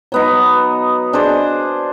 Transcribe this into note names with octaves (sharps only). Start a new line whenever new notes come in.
F#3 B3 D#4
D4 G#4 C5